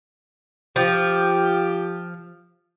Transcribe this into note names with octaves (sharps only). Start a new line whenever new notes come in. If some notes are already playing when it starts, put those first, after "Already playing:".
F3 G4